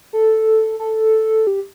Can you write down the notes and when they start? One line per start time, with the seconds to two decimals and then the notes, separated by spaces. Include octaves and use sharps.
0.13 A4
0.80 A4
1.47 G4